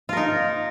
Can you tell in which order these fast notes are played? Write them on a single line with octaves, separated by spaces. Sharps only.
F4 A#4 D#4